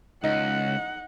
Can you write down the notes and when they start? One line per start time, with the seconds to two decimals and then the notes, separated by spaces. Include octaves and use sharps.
0.24 C#2 D#4 F#5